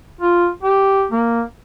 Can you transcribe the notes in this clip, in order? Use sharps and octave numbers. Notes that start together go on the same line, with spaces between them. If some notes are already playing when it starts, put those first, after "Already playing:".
F4
G4
A#3